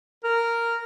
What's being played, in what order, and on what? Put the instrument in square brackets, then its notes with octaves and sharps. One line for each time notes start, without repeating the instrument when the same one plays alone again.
[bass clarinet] A#4